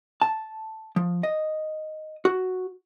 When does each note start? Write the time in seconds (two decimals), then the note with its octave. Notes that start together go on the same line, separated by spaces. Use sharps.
0.22 A5
0.96 F3
1.23 D#5
2.25 F#4